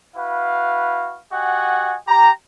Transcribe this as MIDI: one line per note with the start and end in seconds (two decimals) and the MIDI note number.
0.16 1.19 64
0.16 1.19 66
0.16 1.19 71
0.16 1.19 77
1.33 1.96 66
1.33 1.96 67
1.33 1.96 75
1.33 1.96 78
1.33 1.96 80
2.07 2.31 67
2.07 2.31 82